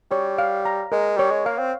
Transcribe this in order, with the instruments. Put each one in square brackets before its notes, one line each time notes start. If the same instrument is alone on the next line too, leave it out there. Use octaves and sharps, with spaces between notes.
[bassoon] G3 [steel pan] C#5
[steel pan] F5
A#5
[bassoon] G#3 [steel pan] A#4
[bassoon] G3 [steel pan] C#5
[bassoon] G#3
[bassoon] A#3 [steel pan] F5
[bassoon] C4